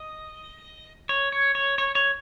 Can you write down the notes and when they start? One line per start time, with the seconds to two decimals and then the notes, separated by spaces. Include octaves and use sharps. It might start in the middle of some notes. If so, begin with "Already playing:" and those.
Already playing: D#5
1.09 C#5
1.32 C#5
1.55 C#5
1.78 C#5
1.95 C#5